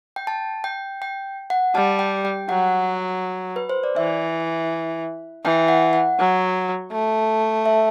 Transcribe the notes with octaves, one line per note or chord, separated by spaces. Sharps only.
G5
A5
G5
G5
F#5
G3 A5
G5
G5
F#3 F#5
B4
C5
D5
E3 E5
E3 G5
F#5
F#5
F#3
A3
E5